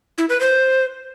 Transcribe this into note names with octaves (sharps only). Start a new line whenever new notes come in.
E4
B4
C5